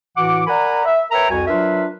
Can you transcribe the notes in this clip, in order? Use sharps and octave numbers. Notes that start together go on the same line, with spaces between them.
A2 E3 F#4 F#5 D6
A#4 D5 F#5 G#5 A#5 B5
E5
A#4 B4 C#5 E5 G5 A#5
C2 F2 F#4 G#5
F#3 D4 F4 A#4 B4 E5